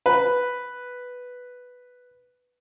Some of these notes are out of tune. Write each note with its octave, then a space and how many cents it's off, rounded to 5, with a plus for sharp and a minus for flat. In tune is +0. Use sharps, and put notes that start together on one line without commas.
B4 +0